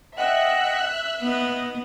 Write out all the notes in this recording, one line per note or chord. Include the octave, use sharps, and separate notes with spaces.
D#5 E5 F#5 G5 E6 F#6
B3 D#4